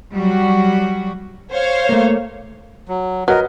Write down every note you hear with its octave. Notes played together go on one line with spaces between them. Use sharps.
F#3 G3 F#4
C5 C#5 F5
A3 A#3
F#3
F#3 A#4 B4 D#5 F#5